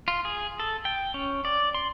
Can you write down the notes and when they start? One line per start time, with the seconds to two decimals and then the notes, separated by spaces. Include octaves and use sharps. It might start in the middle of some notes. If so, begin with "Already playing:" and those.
0.08 F4
0.25 G#4
0.60 A4
0.85 G5
1.14 C#4
1.45 D5
1.75 C6